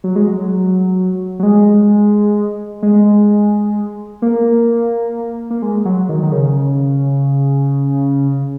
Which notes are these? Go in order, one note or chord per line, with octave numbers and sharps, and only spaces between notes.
F#3
G#3
F#3
F#3
G#3
G#3
A#3
A#3
G#3
F#3
D#3
D#3
C#3